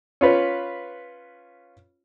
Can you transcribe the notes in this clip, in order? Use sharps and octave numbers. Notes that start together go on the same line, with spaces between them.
C#4 F4 B4